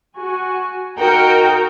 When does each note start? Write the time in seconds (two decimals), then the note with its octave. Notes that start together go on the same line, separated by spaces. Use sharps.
0.16 F#4 G#5
0.99 D#4 F#4 A#4 G5 A#5